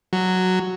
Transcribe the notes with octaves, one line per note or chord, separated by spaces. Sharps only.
F#3